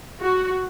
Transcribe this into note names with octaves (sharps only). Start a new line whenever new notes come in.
F#4